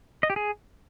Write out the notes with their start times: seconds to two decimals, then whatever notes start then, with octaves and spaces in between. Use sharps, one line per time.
0.23 D#5
0.30 G4
0.36 G#4